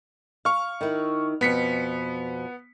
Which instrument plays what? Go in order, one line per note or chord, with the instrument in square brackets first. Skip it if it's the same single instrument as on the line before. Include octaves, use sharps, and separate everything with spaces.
[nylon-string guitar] F5 [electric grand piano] C#6 F6
[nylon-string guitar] D#3 E4
[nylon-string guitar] F2 B2 [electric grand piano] B3 B6 C#7